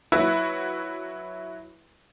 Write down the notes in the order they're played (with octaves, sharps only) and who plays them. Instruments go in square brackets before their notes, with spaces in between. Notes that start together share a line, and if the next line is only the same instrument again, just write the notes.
[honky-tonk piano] F#3 E4 F#4 B4 E5